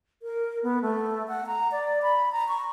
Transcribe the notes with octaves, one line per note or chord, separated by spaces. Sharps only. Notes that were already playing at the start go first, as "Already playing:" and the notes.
A#4
B3
A3
F#5
A#5
D5
B5
A#5
C#6